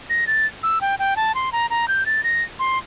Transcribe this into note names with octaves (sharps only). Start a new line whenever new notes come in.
A#6
A6
E6
G5
G5
A5
C6
A#5
A#5
G6
A6
A#6
C6